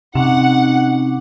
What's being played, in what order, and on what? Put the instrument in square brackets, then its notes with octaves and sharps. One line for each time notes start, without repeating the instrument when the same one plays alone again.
[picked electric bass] C3 [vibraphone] C4 C#4 D6 [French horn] D#4 [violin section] F#5